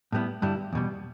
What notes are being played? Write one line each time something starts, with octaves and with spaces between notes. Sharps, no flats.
A2 G3 B3 E4
G2 D3 G3 E4
E2 B2 G3